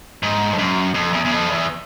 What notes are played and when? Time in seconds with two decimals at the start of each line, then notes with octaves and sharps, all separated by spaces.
0.23 G#2
0.53 F2
0.58 F#2
0.94 F2
1.13 E2
1.25 E2
1.31 F2
1.49 E2